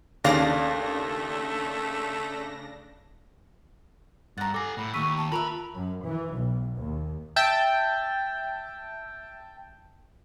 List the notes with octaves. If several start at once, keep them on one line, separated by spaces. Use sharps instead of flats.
D#2 C#3 A3 D4 F5 A#6
G2 F#5 A#5 A6
A4 G#5 D6 A#6
A2 B5
D#2 C#6 E6 B6 D#7
A5
F4 A#4 B4 E5 B5 F7
F#2
E3
B1
D#2
E5 G5 A5